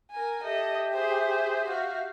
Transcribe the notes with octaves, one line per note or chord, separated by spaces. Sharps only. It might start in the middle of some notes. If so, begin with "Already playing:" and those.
A#4 G#5
G4 A4 D#5 E5 G6
G#4 C5
F#4 F5